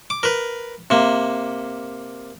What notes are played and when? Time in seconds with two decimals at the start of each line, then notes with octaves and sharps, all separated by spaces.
0.10 D6
0.23 A#4 B4
0.90 C3 A#3